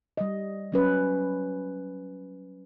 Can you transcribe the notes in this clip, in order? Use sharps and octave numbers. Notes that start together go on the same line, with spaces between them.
G3 D#5
F#3 C#4 B4